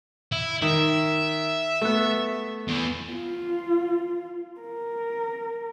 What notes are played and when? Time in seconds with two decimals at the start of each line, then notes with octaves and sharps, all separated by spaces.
0.32 E4
0.62 D#3 E5
1.82 A3 B3
2.68 E2
3.11 F4
4.61 A#4